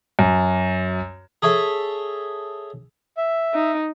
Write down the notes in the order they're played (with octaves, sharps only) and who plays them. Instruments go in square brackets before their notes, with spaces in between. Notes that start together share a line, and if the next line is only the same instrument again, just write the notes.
[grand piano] F#2
[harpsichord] G#4 A4 C#5 E5
[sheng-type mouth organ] E5
[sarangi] D#4